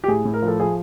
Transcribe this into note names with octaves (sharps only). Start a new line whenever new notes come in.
G4
A2 G#4
A2
A#4
F3
A4
F3 G#4